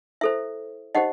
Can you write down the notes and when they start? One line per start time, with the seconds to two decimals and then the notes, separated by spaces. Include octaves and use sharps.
0.21 E4 A4 C5 E5
0.95 D#4 G4 C5 D#5 F#5